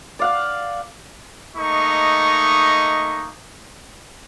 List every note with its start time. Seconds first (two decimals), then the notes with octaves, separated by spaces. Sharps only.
0.19 D5 F5 F#5
1.56 A3 A#3 D#4 D#5 C#6